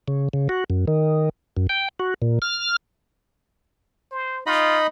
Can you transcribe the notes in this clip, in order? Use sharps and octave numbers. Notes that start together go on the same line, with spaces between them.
C#3
C#3
F#4
F#2
D#3
F#2
G5
F#4
A#2
F6
C5
D#4 F4 D#5 B5